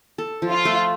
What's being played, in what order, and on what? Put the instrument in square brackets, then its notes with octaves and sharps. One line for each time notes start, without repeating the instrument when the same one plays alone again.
[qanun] A4
F3
[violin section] F4
[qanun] A3